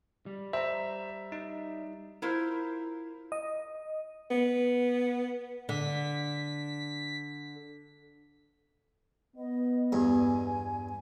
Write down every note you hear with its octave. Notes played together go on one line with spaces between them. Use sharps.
G3
C5 E5 A#5
D#4
E4 F4 A#4 C5
D#5
B3
D3 B6
B3 D#5
E2 G2 G#5